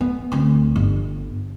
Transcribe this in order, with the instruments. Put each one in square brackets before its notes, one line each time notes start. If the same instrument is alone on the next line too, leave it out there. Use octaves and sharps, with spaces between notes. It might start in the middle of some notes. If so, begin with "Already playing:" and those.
[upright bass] B3
D2 C4
G1